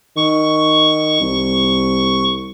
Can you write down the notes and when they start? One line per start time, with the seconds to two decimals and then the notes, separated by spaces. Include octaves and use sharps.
0.17 D#3 C#6
1.21 C2